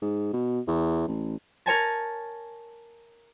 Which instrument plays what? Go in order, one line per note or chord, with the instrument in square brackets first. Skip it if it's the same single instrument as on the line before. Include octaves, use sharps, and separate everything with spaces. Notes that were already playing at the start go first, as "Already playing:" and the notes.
[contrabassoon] G#2
B2
E2
A1
[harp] A#4 C#5 G#5 A5